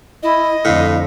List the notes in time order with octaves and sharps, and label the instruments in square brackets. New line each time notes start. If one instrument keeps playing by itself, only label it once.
[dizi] E4 [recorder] D#5
[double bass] F2 D3 [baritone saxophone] A2 [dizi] F5